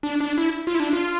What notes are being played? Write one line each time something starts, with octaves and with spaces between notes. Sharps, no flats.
D4
D4
E4
F4
E4
D4
F4